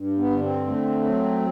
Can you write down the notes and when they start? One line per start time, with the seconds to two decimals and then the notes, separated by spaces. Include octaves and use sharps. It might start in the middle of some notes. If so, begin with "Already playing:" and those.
Already playing: G2
0.18 B3
0.30 D3
0.43 C4
0.67 A3
1.04 F#3